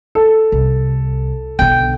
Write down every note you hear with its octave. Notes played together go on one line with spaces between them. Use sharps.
A4
C2
B1 D3 G5